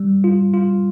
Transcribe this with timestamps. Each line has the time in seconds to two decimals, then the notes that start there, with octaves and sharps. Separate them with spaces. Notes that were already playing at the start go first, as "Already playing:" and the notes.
Already playing: G3
0.24 F4
0.54 F4